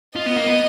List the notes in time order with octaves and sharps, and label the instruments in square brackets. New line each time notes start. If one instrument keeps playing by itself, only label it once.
[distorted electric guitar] F4 [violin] D#5
[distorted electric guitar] B3
A#3
B3